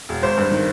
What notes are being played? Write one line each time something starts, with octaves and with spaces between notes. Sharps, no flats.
E1
G#1 C5
G2
D#3